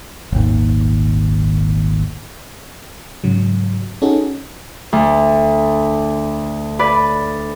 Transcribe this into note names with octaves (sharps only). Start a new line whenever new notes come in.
D#1 G#1 D#2
G#2 C#3 F#3
C#4 D#4 F#4 G#4 A4
D2
B4 D5